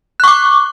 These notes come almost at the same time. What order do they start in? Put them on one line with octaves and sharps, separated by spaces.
F#6 C#6 D6